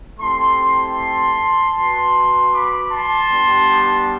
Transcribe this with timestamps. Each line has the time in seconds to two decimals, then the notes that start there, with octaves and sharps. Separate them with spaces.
0.20 A3 C4 E4 G4 A5 C6
1.75 B3 F#4
2.53 B5 D6
2.92 A5 C6
3.30 G3 B3 D4 G4